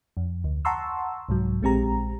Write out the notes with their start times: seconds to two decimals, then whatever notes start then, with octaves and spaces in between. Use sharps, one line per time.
0.17 F2
0.44 D2
0.65 F#5 A5 A#5 C6 C#6 E6
1.29 C2 G#2 F#3
1.62 A#1 G#3 C4 G4 A#5